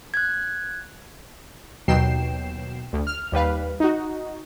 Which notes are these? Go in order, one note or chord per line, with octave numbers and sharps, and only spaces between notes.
F#6 G#6
D#2 B2 F#3 G5 C7 E7
D2
F6
D#2 G3 B4 F5
D#4 F#4